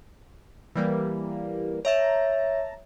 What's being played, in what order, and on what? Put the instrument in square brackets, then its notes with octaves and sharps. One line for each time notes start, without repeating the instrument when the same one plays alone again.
[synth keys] E3 G3 A#3
[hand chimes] C#5 E5 [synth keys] A5 A#5